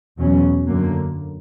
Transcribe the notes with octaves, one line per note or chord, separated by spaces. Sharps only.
E2 B2 F#3 C#4
F#2 D3 F#3 A#3